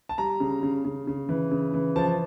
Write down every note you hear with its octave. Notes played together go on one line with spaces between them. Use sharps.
A5
G3 A#5
C#3
C#3
C#3
C#3
E3
C#3
E3
F3 A5